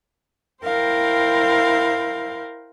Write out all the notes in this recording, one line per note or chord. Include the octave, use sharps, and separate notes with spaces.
E4 A#4 C5 F5 G5